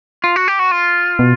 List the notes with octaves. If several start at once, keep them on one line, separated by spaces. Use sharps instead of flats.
F4
F#4
G4
F#4
F4
B2